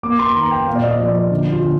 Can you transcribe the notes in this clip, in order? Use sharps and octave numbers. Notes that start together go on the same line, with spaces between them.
A#3 D6
C6
D#3 A#5
G5
A#2 F5
D5
D#5
F3 D5
D5
D3
F4
D3